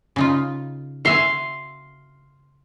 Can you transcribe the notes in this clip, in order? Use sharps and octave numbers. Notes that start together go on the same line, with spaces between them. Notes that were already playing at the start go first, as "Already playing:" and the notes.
C#3 D#4 F4
F#4 E5 F5 G#5 C6